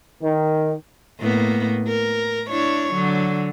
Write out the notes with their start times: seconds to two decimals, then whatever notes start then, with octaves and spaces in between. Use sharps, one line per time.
0.22 D#3
1.19 A2 A#3 B3
1.88 A#4
2.49 D4 E4 C#5
2.92 D3 F#3